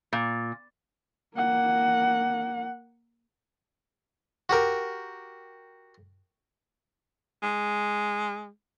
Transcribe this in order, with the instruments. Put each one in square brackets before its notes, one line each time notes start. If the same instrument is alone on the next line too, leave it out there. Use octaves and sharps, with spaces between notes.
[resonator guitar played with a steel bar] A#2
[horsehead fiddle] A#3 F#5
[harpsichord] F#4 G4 A#4
[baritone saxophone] G#3